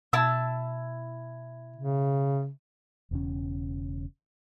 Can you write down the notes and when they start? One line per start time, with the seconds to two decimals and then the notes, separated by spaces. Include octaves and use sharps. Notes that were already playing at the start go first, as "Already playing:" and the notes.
0.13 B2 E4 A5 E6
1.76 C#3
3.11 E1 E2 C#3 C#4